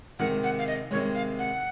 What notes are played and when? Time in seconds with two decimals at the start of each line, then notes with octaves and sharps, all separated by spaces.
0.19 C3 D#3 G#3 F#5
0.44 F#5
0.58 F5
0.67 D#5
0.91 C3 D#3 G#3 C#5
1.15 F5
1.39 F#5